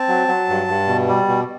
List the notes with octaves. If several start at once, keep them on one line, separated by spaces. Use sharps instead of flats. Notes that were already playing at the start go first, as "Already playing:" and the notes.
Already playing: C4 A5
F#3
F#3
G2
G2
B2
G3
B2